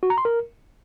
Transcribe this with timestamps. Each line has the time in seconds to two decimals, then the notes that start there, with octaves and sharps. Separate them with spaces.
0.03 F#4
0.10 A#5
0.18 C6
0.25 A#4